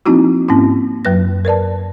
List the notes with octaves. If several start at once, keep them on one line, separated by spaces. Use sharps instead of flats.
F3 A#3 C4 D#4 E4 F#4
G#2 A#3 C4 C#4 E4
F#2 F#3 B4 A#6
A#4 B4 D5 A5